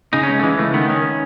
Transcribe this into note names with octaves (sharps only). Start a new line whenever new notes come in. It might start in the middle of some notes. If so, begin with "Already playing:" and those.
C#3 D#4
C#4
C#2
A3
E3 G#3
C#2 A3
D#3 B3
D#3 C#4